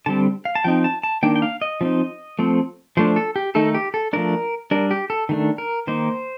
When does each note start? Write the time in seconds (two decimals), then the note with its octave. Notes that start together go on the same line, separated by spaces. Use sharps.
0.06 D3 G3 C4 A5
0.45 F5
0.55 A5
0.64 F3 C4 D#4 G5
0.84 A5
1.03 A5
1.23 D#3 A#3 D4 G5
1.36 G5
1.42 F5
1.61 D#5
1.81 F3 C4 D#4
2.39 F3 A3 C4
2.97 F3 A3 D4 C5
3.16 A4
3.36 G4
3.55 D#3 A3 D#4 A4
3.74 G4
3.94 A4
4.13 F3 A3 D4 A#4
4.71 G3 D4 A#4
4.91 G4
5.10 A4
5.29 D#3 A3 D4
5.58 A#4
5.87 D#3 A#3 D#4 C5